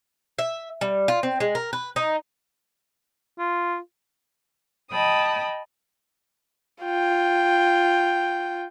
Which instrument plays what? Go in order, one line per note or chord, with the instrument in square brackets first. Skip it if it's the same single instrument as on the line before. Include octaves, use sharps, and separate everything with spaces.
[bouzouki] E5
G3
F4
C4
G#3
A#4
B4
D#4
[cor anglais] F4
[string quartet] D#5 G5 A5 B5 D#6
[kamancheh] F4 G5